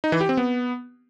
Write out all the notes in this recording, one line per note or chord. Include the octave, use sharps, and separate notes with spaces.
D#4
E3
G4
C4
B3